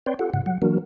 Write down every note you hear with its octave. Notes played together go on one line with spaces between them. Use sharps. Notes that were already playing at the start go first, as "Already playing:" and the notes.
C4 B4 C#5 D5 G5 C6
F4 G4 A4 F#5
G#2 C#3 F#5
F#3 F#5
E3 F#3 A#3 D4 F#4 A#4